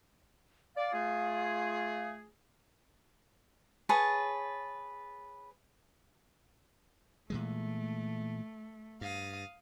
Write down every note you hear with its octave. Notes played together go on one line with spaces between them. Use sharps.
D5 F5
A3 F4 G#4
G#4 B4 C#5 A5
A#2 E3 G#3 A3
G2 F5 D#6